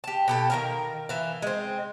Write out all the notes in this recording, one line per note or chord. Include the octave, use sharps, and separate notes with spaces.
G4 A5
B2 G4 A4
D#3 A#4 F5
E3 F5
G#3 C4